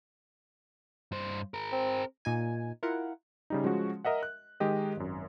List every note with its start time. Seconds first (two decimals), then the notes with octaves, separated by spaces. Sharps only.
1.12 G2 C5
1.54 G#4 A#4
1.72 C4
2.25 A#2 D#4 G#5
2.83 E4 F4 A#4 F#5
3.50 C#3 G3 D#4
3.64 F3 G#3 C#4 F#4
4.05 A#4 D#5 E5 F#5
4.23 F#6
4.60 D#3 G#3 G4 D#5
4.97 G#1 F#2